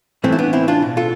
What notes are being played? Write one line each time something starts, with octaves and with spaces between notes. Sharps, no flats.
A2 E3 A3 C4
E4
B3 D4
C4 E4
D4 F4
B2
F4 A4